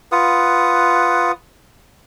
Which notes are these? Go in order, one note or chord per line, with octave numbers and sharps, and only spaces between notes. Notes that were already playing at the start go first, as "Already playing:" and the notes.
F4 B4 F#5 D#6